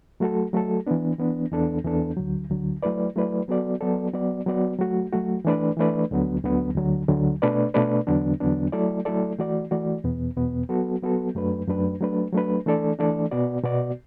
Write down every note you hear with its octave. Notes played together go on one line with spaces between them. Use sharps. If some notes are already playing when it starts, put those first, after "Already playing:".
F#3 A3 F#4 A4
F#3 A3 F#4 A4
E3 B3 D4
E3 B3 D4
E2 E3 B3 D4 A4
E2 E3 B3 D4 A4
D2 D3 F#3
D2 D3 F#3
F#3 A3 E4 B4 D5
F#3 A3 E4 B4 D5
F#3 B3 F#4 A4 D5
F#3 B3 F#4 A4 D5
F#3 B3 F#4 D5
F#3 B3 F#4 D5
F#3 A3 F#4
F#3 A3 F#4
E3 A3 D4 B4 D5
E3 A3 D4 B4 D5
D2 D3 F#3 B3
D2 D3 F#3 B3
D2 D3 F#3
D2 D3 F#3
B2 A3 D4 B4 D5
B2 A3 D4 B4 D5
E2 D3 F#3 B3 D4
E2 D3 F#3 B3 D4
F#3 A3 E4 A4 D5
F#3 A3 E4 A4 D5
E3 A3 F#4 D5
E3 A3 F#4 D5
E2 B2 B3
E2 B2 B3
F#3 B3 F#4 A4
F#3 B3 F#4 A4
F#2 F#3 A3 D4 B4
F#2 F#3 A3 D4 B4
F#3 A3 D4 B4
F#3 A3 D4 B4
E3 A3 D4 A4 D5
E3 A3 D4 A4 D5
B2 B3 F#4 D5
B2 B3 F#4 D5